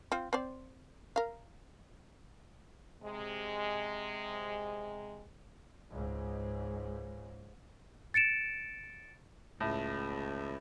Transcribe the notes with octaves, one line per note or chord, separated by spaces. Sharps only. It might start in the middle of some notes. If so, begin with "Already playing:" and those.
C4 F4
C4 C5 D5
A#4 F5
C3 G#3
C#2 G#2
A6 C#7 D7 E7
C#2 A2